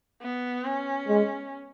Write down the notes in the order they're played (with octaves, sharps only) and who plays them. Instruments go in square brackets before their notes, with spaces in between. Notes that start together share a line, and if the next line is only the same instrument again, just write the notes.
[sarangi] B3
C#4
[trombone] G#3